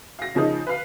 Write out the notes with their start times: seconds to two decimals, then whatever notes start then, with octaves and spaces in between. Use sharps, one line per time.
0.19 F5 A#6
0.35 C#3 F3 A#3 D#4
0.67 B4 F5